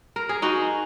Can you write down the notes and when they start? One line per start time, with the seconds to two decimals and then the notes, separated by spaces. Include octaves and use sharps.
0.16 A#4
0.29 G#4
0.42 D#4 F#4